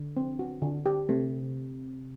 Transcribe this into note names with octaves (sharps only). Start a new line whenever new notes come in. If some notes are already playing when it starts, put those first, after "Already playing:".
Already playing: D3
C4
F#4
D3
G4
C3 A3